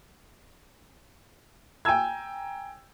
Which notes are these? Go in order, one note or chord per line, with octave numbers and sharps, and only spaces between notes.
G5 G#5 A#5 E6 G#6